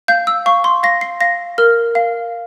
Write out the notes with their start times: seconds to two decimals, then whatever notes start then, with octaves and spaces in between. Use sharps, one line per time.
0.08 F5 G6
0.27 E6
0.46 F5 C#6
0.64 C6
0.83 F5 A#6
1.01 C7
1.21 F5 A#6
1.58 A#4 F6
1.95 F5